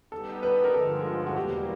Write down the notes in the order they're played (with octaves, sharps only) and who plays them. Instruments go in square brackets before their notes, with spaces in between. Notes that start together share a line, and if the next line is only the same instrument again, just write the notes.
[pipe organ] G3 B3 D#4 G4 [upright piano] A4
[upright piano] B4
A#4
[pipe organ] G2 D3 F3 G#3 [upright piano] A4
[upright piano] F#4
[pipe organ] E2 B2 G3 A#3 [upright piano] G4